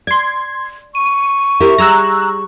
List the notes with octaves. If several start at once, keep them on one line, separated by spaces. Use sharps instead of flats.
D5 C6 G#6
C#6 D#7
E4 G4 A#4
G3 G#4 A#5 E6 F#6